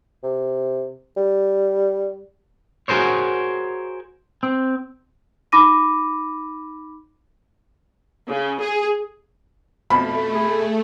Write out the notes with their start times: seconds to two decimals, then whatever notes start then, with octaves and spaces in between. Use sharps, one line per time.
0.23 C3
1.17 G3
2.88 F#4 G#4 A#4 C5 C#5
4.43 C4
5.52 D#4 B5 D6 A#6 D#7
8.28 C#3
8.61 G#4
9.90 F2 B2 F3 A3 B5
10.35 G#4